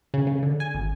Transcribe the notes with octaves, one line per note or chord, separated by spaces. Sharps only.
C#3
C#3
D3
G#5
G#1